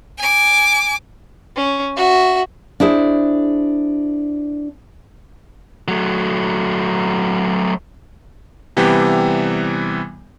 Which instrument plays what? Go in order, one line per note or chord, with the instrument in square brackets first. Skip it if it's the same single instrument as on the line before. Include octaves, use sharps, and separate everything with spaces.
[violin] G#5 D6
[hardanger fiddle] C#4
F#4 E5
[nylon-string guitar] D4 E4 G#4 C5
[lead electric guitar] F#3 A3
[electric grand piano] C3 E3 G3 B3 G4